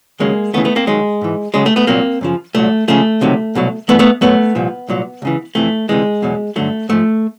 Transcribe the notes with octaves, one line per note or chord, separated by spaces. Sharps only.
D#2 C#3 F#3 G#3 A#3
D#2 C#3 E3 A3 B3
A3 B3
A#3 C4
D#2 D#3 F#3 G#3
G#2 E3
C#2 C#3 F#3 G#3
A3
A3 B3
C2 A#2 F#3 A#3 C4
F#2 C#3 F3
C2 A#2 F#3 A3
C#2 C#3 F3 A3
C#2 C3 D#3 F#3
C2 B2 F#3
G2 E3 A3 B3
A3 B3
F#2 D#3 F#3 A3 B3
C2 A#2 F3
C2 A#2 F#3
C#2 C#3 E3
F2 C3 E3 A3
D2 C3 E3 G#3
E2 B2 F#3
G2 D3 F#3 A3
G#2 F3 A3